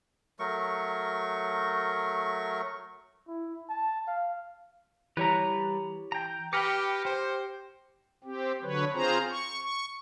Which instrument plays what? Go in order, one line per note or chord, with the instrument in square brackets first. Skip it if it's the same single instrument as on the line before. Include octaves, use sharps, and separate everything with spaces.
[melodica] F#3 A3 A#4 C#6
[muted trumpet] E4
A5
F5
[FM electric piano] E3 [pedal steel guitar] G3 B4 [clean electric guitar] G4 C#5 A#5
[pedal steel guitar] G5 A#5
[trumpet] G4 [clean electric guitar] B4 G5 [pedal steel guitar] B5 D6 [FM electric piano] F6 A#6 C#7
[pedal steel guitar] G4 [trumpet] C5
[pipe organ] C4 G4
D3 F#3 B4 C#5
C4 F4 G#4 C5 A#5
C#6
C#6